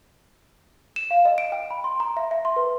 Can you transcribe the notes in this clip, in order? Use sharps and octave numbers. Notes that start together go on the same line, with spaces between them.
E7
F5
D#5
D7
G5
B5
C6
A#5
E5
E5
C6
B4